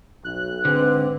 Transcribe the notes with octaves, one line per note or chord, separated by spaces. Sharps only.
B1 F#6
G#2 D3 C4 B4